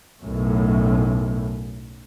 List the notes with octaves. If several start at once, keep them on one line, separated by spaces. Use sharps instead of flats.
B1 F#2 A2